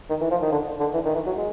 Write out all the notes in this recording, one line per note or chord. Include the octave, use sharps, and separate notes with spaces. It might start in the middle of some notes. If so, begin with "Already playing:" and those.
D#3
E3
F3
D#3
D3
D3
E3
D#3
E3
F#3
G#3